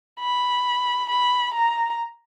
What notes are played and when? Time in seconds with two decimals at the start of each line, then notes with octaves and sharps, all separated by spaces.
0.20 B5
1.10 B5
1.54 A#5